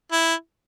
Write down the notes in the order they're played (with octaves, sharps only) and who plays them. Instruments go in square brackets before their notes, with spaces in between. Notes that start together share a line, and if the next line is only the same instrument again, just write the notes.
[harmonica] E4